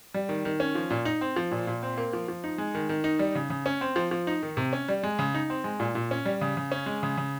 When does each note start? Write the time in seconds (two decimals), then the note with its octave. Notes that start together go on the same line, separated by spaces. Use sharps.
0.14 G3
0.29 D#3
0.45 D#3
0.60 C#4
0.75 F3
0.91 A#2
1.05 D#4
1.21 C4
1.36 F3
1.52 A#2
1.67 A#2
1.83 C4
1.98 A#3
2.13 F3
2.28 F3
2.44 D#4
2.58 G#3
2.75 D#3
2.89 D#3
3.04 D#4
3.19 G3
3.35 C#3
3.50 C#3
3.66 C#4
3.81 C4
3.96 F3
4.11 F3
4.27 D#4
4.43 D#3
4.57 C3
4.73 C#4
4.88 G3
5.04 G#3
5.19 C#3
5.34 D#4
5.50 C4
5.64 G#3
5.80 A#2
5.95 A#2
6.11 C#4
6.26 G3
6.41 C#3
6.57 C#3
6.72 C#4
6.86 G#3
7.03 C#3
7.17 C#3